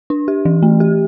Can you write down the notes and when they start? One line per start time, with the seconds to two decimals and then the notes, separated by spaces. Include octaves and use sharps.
0.10 D4
0.28 G4
0.45 E3
0.63 A3
0.80 G4